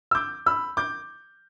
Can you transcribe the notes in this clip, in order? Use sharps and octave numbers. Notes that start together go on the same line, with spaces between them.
E6
D6 G6
B5 E6
D6 G6